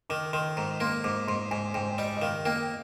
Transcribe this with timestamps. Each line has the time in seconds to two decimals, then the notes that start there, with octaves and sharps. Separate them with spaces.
0.10 D#3 D6
0.33 D#3 C6
0.57 G#2 A#5
0.80 A#3 C6
1.04 G#2 D6
1.27 G#2 C6
1.51 G#2 G#5
1.74 G#2 G5
1.98 G3 D#5
2.17 D#5
2.22 D#3 F5
2.45 A#3 G5